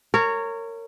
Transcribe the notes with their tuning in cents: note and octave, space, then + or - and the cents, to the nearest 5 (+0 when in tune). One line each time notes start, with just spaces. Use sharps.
A#4 -25 C#5 +0